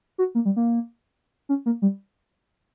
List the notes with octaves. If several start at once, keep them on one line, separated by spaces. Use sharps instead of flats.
F#4
A#3
G3
A#3
C#4
A#3
G3